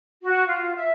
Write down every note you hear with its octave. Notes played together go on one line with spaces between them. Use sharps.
F#4
F4
E5